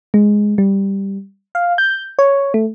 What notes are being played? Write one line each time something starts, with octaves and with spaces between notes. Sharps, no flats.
G#3
G3
F5
G6
C#5
A3